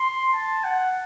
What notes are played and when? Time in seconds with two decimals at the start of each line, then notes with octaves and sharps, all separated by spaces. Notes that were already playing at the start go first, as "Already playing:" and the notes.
Already playing: C6
0.33 A5
0.64 F#5